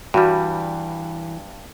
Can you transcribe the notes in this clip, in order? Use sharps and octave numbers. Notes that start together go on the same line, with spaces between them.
G2 E3 G3 F#4